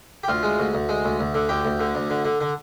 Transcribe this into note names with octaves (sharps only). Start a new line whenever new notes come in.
G4
D2 F4
G#3
D2
D2
G#3
D2
D2
D3
D2 G4
D2
D3
D2
D3
D3
D3